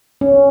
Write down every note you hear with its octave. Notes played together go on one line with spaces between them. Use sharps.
C#4